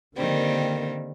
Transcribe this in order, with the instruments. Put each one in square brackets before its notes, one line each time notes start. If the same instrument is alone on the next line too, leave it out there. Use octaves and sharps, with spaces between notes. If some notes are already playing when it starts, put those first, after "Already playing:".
[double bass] D3 A#3 [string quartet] D#3 G3 C4